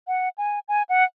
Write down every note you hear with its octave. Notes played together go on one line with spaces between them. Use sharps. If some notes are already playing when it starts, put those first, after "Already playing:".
F#5
G#5
G#5
F#5